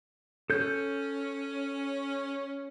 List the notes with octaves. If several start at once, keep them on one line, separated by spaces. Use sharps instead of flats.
C#4 A4 G6